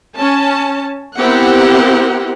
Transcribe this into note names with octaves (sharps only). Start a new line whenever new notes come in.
C#4 A5
B3 C4 E4 G4 A#4 F#5